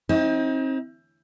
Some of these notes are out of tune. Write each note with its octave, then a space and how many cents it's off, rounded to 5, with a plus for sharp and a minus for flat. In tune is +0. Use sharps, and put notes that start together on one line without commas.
C4 +30 D#4 +35